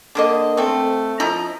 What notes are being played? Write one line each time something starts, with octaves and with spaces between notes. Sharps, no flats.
D3 A#3 D#5
A3 C4
F3 E4 D#5 A#5